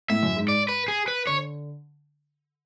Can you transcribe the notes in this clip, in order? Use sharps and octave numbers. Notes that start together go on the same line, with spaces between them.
A2 E5
F#2
G#2
D5
B4
G#4
B4
D3 C#5